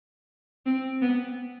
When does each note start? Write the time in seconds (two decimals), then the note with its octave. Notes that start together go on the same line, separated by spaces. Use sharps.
0.66 C4
1.01 B3